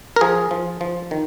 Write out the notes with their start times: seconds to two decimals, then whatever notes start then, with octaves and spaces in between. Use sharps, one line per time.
0.16 A#4
0.21 F3 G#4
0.51 F3
0.81 F3
1.11 D#3